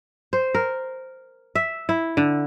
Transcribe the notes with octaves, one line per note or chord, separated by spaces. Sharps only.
C5
A#4
E5
E4
D3